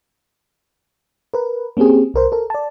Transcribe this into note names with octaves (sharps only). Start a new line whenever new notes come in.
A#4 B4
A#3 C4 C#4 G4 G#4
C2 A#4 C5
A4 A#4
D5 A5